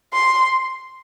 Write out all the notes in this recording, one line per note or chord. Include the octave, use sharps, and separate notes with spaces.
C6